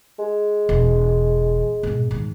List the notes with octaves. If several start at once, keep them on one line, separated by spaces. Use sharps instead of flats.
G#3
E1
G#2 B2
G#2 D#3